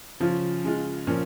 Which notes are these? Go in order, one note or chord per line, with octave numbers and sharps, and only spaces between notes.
C#3 F3 C#4 F4
C#3 G#3 F4
A#2 F3 A#3 C#4